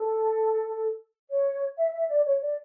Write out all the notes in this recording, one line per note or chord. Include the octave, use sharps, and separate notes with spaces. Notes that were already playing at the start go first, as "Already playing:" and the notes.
Already playing: A4
C#5
E5
E5
D5
C#5
D5